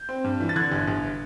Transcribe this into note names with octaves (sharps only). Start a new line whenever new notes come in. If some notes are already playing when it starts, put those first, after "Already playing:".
Already playing: G6
C4
G2
E3
A6
D3 F#6 G#6
G1
G1